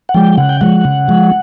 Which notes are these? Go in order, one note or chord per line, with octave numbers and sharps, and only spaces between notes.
F#5
F3 G#3 G5
C#3 F#5
G5
F3 G#3 F#5
C#3
F3 G#3